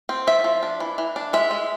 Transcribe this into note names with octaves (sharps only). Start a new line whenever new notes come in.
C4
F3 E5
F3
D4
E3
E3
D4
G#3 E5
G#3